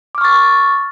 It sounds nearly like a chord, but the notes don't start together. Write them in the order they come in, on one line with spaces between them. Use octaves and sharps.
D6 F6 C#6 A6